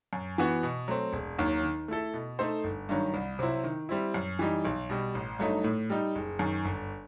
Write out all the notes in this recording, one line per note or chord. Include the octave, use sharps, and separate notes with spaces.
F#2
E3 B3 F#4
B2
F#3 A3 C4
E1
D#2 D#3 F#3
D#3
A3 E4 A4
B2
A3 D#4 A4 C5
G1
G2 D#3 F#3
C2
C3 F#3 C4 E4
D#3
G3 C4 E4
F#2
E3 G3 D#4
B1
B2 G3
A1
G2 F#3 A3 D#4
A2
G3 D#4
F#1
F#2 D#3
G1